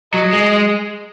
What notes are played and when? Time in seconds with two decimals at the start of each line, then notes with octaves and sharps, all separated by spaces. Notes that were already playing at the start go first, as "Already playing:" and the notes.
0.14 F#3 D#5
0.33 G#3